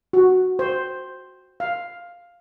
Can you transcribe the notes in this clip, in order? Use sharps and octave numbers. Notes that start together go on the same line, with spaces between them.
F#4
C5
F5